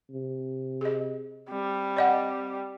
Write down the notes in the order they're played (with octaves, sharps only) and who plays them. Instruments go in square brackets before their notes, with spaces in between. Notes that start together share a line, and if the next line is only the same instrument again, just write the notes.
[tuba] C3
[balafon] G#4 D#5
[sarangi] G3 [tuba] C4
[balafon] D5 D#5 F#5